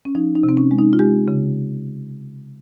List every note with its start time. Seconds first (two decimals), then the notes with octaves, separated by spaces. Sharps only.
0.05 C#4
0.15 F3 D#4
0.35 D#4
0.43 C3
0.49 C4
0.57 C#4
0.71 G#3
0.79 D#4
0.93 F4
0.99 G#3 G4
1.28 C#3